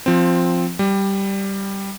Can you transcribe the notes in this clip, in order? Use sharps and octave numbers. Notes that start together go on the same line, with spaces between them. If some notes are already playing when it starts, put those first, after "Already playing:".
F3 C4
G3